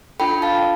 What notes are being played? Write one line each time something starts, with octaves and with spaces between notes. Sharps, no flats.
D4 F4 A4 G5 B5
F5 A5